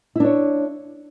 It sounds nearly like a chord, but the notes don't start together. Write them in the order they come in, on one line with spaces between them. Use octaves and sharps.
E4 D4 C#5